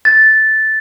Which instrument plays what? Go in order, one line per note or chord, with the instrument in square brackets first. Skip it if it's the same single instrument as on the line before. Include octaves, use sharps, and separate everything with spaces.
[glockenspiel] A6